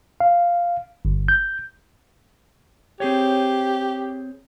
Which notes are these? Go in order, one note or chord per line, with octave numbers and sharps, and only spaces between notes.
F5
G1
G6
C4 G4 G#4 C#5